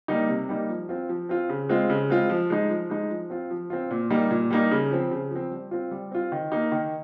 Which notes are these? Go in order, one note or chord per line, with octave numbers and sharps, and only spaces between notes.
G3 A#3 D#4
C3
G3 A#3 D#4
F3
C4 F4
F3
C4 F4
C#3
G#3 C4 F4
C#3
G#3 C4 F4
F3
G#3 D#4
F3
G#3 D#4
F3
C4 F4
F3
C4 F4
A#2
G3 A#3 D#4
A#2
G3 A#3 D#4
C#3
F3 C4
C#3
F3 C4
G3
C4 F4
G3
C4 F4
D#3
A#3 D#4
D#3